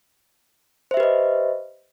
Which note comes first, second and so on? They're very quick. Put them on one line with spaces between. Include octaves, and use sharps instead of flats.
C5 E5 G4 B4 D#5